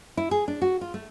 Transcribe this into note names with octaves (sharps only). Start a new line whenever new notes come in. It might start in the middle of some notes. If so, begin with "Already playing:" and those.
E4
G#4
D4
F#4
F4
A3